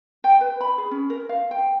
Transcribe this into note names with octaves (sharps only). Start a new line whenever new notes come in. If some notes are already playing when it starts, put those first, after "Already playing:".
G5
B4
B5
G#4
C#4
A#4
F5
G5